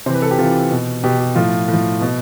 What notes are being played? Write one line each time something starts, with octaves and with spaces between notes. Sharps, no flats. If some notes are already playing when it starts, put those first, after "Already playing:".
C3 E3 C5
B4
A4
G4
C3 E3 F4
B2
B2 G4
G4
A2 F3 F4
A2
F3
B2